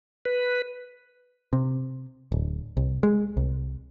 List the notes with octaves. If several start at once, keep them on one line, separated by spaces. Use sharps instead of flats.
B4
C3
D1
C2
G#3
C2